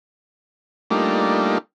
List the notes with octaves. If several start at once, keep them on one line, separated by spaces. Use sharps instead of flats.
G3 A3 A#3 D4 D#4 F4